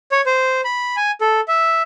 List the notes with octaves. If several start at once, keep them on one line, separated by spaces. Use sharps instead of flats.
C#5
C5
B5
G#5
A4
E5